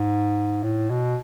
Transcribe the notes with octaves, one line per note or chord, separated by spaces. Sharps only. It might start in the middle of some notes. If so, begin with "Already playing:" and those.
Already playing: G#2
A2
B2